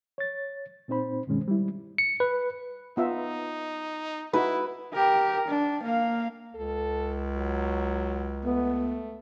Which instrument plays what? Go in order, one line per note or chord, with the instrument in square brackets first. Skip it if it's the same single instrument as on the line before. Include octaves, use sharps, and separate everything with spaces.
[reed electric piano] C#5 A6
A#2 C4 D#4 C5 B5
G2 B2 D#3 G#3 C#4
G3 E4
[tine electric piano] C#7
B4
[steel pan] B3 F4 E5 [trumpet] D#4
[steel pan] D#4 F#4 [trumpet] E4 [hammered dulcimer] B4
[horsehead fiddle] G4 A#4
D4
A#3 F5
[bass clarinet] C#2 [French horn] A4
[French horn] F#3
[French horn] A3 [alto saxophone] B3